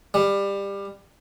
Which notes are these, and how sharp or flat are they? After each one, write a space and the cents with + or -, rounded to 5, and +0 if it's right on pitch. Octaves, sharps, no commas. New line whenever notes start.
G3 +20